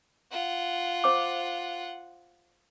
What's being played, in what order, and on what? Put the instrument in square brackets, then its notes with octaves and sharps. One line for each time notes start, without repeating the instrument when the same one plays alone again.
[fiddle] F4 F#5
[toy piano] C5 D6